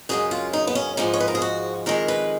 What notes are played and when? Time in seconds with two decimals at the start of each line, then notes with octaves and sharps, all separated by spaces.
0.09 F#2 C#3 G#3 G#4
0.31 F4
0.53 D#4
0.67 B3
0.75 C#4
0.97 G#2 F3 G#3 D#4
1.14 C#5
1.20 B4
1.28 A#4
1.35 G#4
1.42 F#4
1.86 F2 D#3 G#3 A#4
2.08 B4